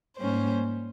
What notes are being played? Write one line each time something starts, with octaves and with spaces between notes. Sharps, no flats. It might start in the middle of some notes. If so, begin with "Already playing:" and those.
G#2 G3 A#3 C#4 C5